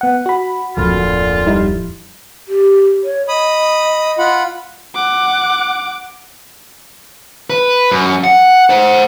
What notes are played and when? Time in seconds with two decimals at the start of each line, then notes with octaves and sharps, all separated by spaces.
0.01 B3 F#5
0.26 F#4 B5
0.77 D1 F2 A#2 D3 F4
1.46 G3 D#4 E4
2.48 G4
3.04 C#5
3.28 D#5 B5 D#6
4.18 F4 F#5 B5
4.95 F#5 D6
7.50 B4
7.91 F#2
8.24 F#5
8.70 C5 F#5